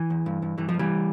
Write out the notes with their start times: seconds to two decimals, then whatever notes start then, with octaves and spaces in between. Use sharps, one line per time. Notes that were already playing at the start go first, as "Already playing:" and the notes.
Already playing: E3
0.10 E2
0.26 G2
0.42 G2
0.58 G2 E3
0.69 F3
0.74 G2
0.79 E3 G3